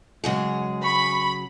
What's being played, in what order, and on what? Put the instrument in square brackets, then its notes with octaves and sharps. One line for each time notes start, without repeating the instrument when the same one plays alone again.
[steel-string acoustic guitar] C#3 F#3 G#4 [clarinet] G#3
[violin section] B5 [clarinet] C#6